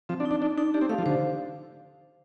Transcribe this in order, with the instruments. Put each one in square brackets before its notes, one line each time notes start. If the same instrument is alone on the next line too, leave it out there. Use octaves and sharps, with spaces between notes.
[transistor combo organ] F3 [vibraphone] C4
[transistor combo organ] D4
[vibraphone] D#4
[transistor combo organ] D4
[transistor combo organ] D4 [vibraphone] D#4
[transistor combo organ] D4 [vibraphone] D#4
[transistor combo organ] D4 [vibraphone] G4
[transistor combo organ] C4
[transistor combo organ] A3 [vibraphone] F5
[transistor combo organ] F3
[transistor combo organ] D3 [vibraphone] C5